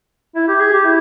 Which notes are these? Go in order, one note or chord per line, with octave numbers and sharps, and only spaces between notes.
E4
G4
G#4
G4
E4